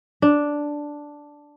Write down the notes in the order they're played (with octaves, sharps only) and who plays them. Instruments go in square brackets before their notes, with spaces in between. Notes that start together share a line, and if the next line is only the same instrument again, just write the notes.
[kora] D4